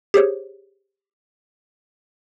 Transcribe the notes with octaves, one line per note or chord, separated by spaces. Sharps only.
G4 G#4 C5 C#5